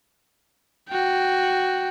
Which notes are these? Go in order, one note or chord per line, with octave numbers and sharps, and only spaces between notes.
F#4 G5